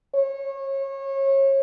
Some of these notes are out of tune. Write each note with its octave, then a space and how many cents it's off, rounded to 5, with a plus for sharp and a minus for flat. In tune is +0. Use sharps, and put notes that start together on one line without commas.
C#5 -30